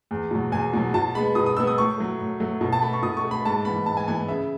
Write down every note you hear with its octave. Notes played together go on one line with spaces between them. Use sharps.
E2
B2 F#3
E2 G#5
B2 F#3
B2 A5
G#3 B3 B5
B2 D#6
D#6
G#3 B3 E6
D#6
A2 C#6
F#3 A3
A2
F#3 A3
B2
A5
A3 B5
C#6
B2 D#6
C#6
A3
B5
G#2 A5
E3 B3 B5
G#2 A5
G#5
E3 B3 G#5
C#3 E5